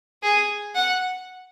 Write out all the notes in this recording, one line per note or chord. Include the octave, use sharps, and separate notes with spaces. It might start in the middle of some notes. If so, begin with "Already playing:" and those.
G#4
F#5